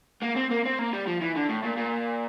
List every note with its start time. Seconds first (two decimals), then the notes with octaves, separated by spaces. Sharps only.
0.23 A#3
0.37 C4
0.51 A#3
0.66 C4
0.79 A#3
0.93 G3
1.07 F3
1.21 E3
1.36 D3
1.49 A2
1.64 A#2
1.77 A#2